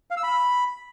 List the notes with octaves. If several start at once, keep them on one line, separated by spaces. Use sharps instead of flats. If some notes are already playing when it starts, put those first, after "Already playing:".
F5
E6
B5